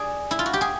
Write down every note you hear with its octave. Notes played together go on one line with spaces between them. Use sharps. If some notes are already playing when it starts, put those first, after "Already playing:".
Already playing: G#4 D5
E4
F4
F#4
G4
G#4